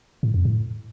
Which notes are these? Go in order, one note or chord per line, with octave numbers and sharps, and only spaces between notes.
A2
F2
A2